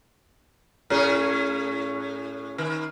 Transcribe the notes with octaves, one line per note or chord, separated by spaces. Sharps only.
A2 C#4 G#4
D#3